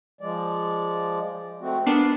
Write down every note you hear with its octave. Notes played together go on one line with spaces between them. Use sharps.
F3 G#3 D5
A3 C4 F#4
B3 D4 A#4 C7